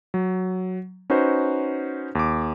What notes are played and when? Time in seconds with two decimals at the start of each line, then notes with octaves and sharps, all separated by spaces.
0.14 F#3
1.10 C#4 D#4 F#4 B4 C5
2.15 D#2 D6